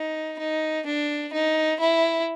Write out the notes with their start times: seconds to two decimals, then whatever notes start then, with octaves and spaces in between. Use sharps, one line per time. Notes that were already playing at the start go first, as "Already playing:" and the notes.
Already playing: D#4
0.38 D#4
0.86 D4
1.33 D#4
1.80 E4